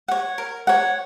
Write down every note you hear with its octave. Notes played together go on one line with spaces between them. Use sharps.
C#5 F#5
A#4
C#5 F#5